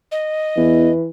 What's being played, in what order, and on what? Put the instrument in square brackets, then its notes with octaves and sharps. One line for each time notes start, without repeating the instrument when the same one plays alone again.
[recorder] D#5
[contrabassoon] E2 [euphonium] E3